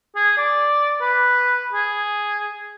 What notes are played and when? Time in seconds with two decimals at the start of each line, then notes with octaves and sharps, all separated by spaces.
0.15 G#4
0.38 D5
1.01 B4
1.73 G#4